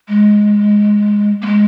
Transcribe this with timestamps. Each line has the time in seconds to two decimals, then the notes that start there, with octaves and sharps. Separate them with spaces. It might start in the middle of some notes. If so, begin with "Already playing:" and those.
0.09 G#3
1.42 A#3
1.46 G#3